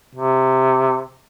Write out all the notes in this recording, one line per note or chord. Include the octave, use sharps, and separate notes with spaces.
C3